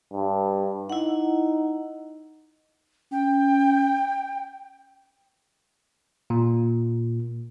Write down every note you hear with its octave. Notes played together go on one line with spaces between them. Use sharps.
G2
D#4 E4 F#5
C#4 G5
A#2